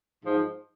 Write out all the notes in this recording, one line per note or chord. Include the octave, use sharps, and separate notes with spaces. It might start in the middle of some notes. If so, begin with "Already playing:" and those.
G#2 F3